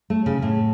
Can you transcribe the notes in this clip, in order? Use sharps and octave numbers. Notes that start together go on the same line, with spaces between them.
A3
C#3
A2